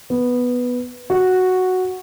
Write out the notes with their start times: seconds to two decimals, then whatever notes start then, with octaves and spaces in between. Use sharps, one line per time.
0.10 B3
1.10 F#4